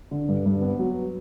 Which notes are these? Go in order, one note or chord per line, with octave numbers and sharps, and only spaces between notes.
D3
G2
G2
B3
F#3